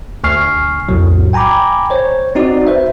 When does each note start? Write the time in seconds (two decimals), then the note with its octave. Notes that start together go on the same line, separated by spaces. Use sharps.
0.24 D2 G#5 C#6 F6 C7
0.88 B1 F2 A2 F#3
1.33 G5 G#5 A#5 B5 D6
1.90 C5 C#5
2.35 C4 D#4 F#4 D5
2.67 B4 C5 E5